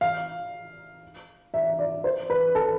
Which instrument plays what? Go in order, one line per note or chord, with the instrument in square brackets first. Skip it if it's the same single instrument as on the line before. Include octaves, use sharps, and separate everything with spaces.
[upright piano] F5
E5
D5
C5
B4
A4